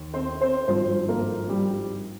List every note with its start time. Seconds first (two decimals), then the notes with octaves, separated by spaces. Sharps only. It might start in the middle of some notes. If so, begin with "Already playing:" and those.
Already playing: D#2 D#3
0.14 C4 C5
0.41 C4 C5
0.68 G#1 G2 F3 C4 C5
1.08 A#3 A#4
1.49 G3 G4